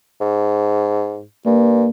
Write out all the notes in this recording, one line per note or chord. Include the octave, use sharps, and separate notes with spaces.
G#2
G2 A#3